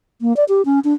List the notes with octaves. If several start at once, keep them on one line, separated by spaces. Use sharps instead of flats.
A#3
D5
G4
C#4
D4